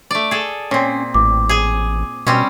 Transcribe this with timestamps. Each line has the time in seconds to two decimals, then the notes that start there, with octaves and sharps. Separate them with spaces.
0.11 A3 D5
0.31 G#4 A4
0.71 A#2 C4 C#4
1.14 A1 D6
1.49 G#4 G#5
2.27 B2 G3 C4 C#4